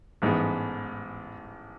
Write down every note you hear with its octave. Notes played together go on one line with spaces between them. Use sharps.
A1 G#2 G#3 B3